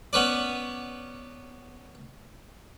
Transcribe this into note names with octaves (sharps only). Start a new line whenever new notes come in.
B3 C#4 B4 D5